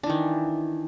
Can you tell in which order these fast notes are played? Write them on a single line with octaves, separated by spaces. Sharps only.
D4 E3 D#3